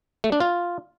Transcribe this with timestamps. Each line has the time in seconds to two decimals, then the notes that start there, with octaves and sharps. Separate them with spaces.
0.24 A3
0.32 D4
0.40 F4